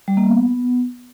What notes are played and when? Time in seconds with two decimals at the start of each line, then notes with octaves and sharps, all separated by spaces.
0.08 G3
0.17 A#3
0.26 B3